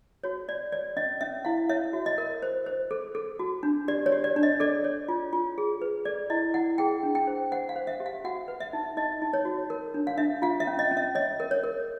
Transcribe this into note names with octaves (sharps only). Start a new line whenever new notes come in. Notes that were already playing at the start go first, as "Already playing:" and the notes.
F#4 C#5
C#5 D5
C#5 D5
C#4 D#5
C#4 E5
E4 F5
C#5 E5
F#4
D#5
A#4
C5
C5
A4
A4
F#4
D4
G4 D5
C#5
G4
D5
D4
D#5
A4 D5
C#5
F4
F4
G#4
B4
A4 D5
E4 D#5
E4 F#5
G#4 G5
D4
G5
C5
C5 F#5
F5
C5
E5
G4
F5
F#4 F#5
B4
E5
D#4
D#4 D#5
D#4
C#5
F#4
A#4
D4
F5
D4 E5
F4 F5
E5
C#4
D#5
C#4
E5
C#5 D#5
A#4
C#5
A#4